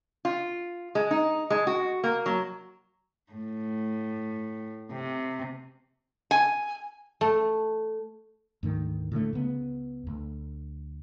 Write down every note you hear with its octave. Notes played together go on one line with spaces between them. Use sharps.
F4
G#3
D#4
G#3
F#4
A#3
F#3
A2
C3
G#5
A3
D2 G#2 D#3
A2 D3 F#3 A3
C#2 C#3 B3
D2